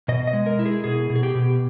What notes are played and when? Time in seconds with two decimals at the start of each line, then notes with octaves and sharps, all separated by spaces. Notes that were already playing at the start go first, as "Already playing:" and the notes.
0.08 B2 D#5
0.27 D#5
0.33 G#3
0.46 A#4
0.59 E4
0.66 G#4
0.84 B2 G#4
1.10 B2
1.16 G#4
1.23 G4
1.35 B2